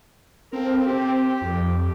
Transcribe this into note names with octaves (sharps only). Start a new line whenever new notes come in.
C4 A4 A#4 F5
C4 G4
F2